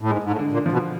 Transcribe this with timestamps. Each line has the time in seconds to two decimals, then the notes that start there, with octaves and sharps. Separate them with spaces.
0.01 A2
0.11 G#2 G#3
0.24 G#2
0.31 A2
0.39 D3
0.52 A#2
0.66 F3
0.72 B2